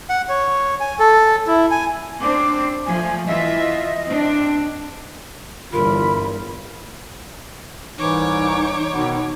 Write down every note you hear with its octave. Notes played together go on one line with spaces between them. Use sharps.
F#5
C#5
G#5
A4
E4
G#5
C4 D4 C5 D6
F3 A3 G#5
E3 F4 D#5 E5
C4 D4
G1 E2 F4 A#4 B5
C2 G#2 E3 D#4 C#5 D6
B2 D#3 B3